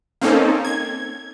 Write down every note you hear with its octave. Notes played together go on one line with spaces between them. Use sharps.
A#3 C4 C#4 D#4 A4
G#6